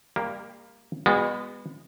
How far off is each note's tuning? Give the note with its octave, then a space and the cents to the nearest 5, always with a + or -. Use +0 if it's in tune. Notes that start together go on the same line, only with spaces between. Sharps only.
G3 +35 A#3 +0 G4 +0
G#3 -35 B3 +0 F#4 -30